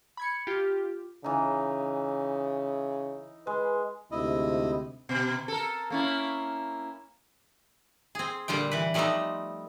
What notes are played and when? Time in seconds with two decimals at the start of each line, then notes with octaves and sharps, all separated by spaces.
0.17 B5 G#6 C#7
0.47 F4 G4
1.24 C#3 E3 D#4
3.47 G#3 B4
4.12 D2 G#2 C3 E4 D#5
5.09 B2
5.48 A4 A#4
5.90 A#3 C#4 E4
8.15 C4 G#4
8.48 A#2 D3 G3 F4 G5
8.71 E3 B4
8.94 F3 G3 A3 B3 C4 D#4